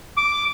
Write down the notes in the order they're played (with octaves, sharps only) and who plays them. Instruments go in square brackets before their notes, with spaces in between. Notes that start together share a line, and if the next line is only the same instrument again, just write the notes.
[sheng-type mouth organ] D6